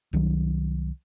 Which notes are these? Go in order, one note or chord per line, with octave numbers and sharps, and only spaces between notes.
C2 D#3 F#3